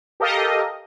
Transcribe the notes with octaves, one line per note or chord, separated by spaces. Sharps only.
G4 A4 A#4 D#5 F5